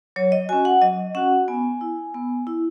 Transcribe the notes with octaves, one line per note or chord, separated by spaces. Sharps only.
F#3 C#5
D#5
C#4 F#4 G#5
F#5
F#3 D#5
C#4 F#4 F#5
B3 G#5
E4
B3
E4